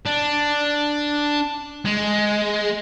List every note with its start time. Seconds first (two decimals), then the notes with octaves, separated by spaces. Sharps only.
0.06 D4
1.86 G#3